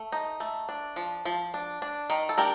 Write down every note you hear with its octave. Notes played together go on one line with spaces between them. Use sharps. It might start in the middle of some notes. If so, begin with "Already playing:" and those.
Already playing: A3
D#4
A3
D4
F3
F3
D4
D4
D#3
A4
D4 G4 A#4